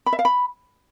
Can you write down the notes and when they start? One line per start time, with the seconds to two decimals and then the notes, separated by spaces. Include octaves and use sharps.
0.06 B5
0.13 E5
0.19 F5
0.25 B5